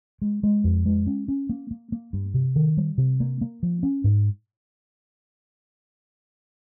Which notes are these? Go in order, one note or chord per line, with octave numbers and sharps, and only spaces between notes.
G#3
G#3
F2
G#3
C#4
C#4
A#3
A#3
A#3
G2
C3
D#3
G3
C3
A#3
A#3
F3
C#4
G#2